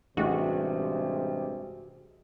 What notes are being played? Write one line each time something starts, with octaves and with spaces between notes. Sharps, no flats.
A1 G2 C3 G#3 F#4 G#4 E5